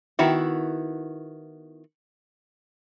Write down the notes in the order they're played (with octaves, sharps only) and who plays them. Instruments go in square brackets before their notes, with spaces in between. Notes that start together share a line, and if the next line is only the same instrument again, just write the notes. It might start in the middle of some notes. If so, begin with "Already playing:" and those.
[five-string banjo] D#3 B3 E4 F#4